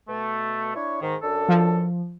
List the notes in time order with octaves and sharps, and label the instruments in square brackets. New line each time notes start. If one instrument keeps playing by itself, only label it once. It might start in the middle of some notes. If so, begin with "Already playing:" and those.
[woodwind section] B2 A3
D4 E4 C#5
G#2 D#3
F#2 D4 A4
[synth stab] F3